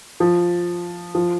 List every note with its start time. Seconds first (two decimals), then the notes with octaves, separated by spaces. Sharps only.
0.20 F3
1.15 F3